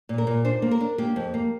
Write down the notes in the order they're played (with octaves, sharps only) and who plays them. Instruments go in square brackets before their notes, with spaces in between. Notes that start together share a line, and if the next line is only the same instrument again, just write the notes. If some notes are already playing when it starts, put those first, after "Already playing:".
[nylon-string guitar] A#2
A#4
A#2
D4 C5
A#3
A#4
D4
A#3 G4
F2
A#3